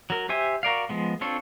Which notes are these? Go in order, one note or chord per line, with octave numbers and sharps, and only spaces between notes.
F#3 A#4
G4 C5 E5 G#5
F#4 A#4 D5 F5
F3 G#3 B3
C4 D4 F4 A4 C#5